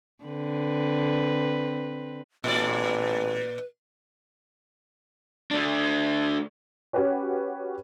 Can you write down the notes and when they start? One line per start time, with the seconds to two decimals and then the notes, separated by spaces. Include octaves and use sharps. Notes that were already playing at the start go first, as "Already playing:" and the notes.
0.24 D3 C4 B4
2.44 A1 A#2 B4 D5
5.51 A3 D4
6.93 C#4 F#4 G4 B4 C#5